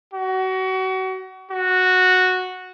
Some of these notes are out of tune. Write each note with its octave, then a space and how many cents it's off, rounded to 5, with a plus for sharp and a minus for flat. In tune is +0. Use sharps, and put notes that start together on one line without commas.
F#4 +30
F#4 -5